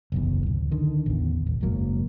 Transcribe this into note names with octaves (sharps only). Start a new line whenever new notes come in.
F#1 B1 E2
D1
D3 D#3
A1 E2
D#1
F#1 G#2 F#3 A#3